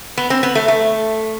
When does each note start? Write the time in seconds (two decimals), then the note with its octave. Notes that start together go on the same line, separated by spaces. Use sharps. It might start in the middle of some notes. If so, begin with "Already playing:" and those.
0.18 B3
0.30 C4
0.43 B3
0.55 A3
0.68 A3